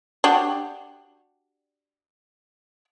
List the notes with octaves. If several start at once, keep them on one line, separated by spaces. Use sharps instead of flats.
D4 F#4 G4